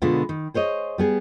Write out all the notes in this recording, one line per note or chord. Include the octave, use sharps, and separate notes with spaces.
B2 D3 G#3 B3 F4
D#3
G#4 C5 C#5 D#5
G3 B3 G#4